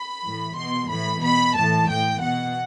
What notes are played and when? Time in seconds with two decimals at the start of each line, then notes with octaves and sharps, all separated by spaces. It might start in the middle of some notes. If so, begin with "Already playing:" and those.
Already playing: B5
0.23 A2 E3
0.57 B2 C6
0.89 A2 E3 B5
1.22 B2 B5
1.55 A2 E3 A5
1.88 A2 E3 G5
2.21 B2 F#5